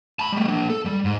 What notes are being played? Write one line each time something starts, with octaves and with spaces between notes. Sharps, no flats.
A5 B5
G3 A3
A#3 D4
A4
G3
G#2